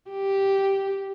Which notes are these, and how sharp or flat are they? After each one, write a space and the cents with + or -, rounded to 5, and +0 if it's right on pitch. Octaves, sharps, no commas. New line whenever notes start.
G4 -5